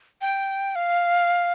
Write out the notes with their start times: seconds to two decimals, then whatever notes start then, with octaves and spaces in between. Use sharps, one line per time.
0.21 G5
0.76 F5